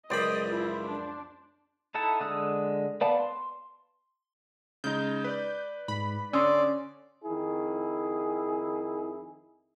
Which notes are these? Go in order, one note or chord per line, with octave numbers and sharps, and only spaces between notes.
C#2 F#2 G#4 C5 D5 D#5 B5
F3 E4
D4
D#4 E4 A4 F#5 A5
D3 G#3 D#6 E6 F#6
B3 B4 D5 F5 A5
C6
C#3 G#3 D#4 G6
B4 D5
G#2 B5
D3 C#4 D5 C6 D#6 E6
F2 D#3 E4 G#4